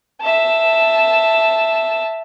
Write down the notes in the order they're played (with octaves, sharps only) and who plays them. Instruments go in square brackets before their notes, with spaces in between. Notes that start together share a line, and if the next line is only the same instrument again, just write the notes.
[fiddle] E5 A5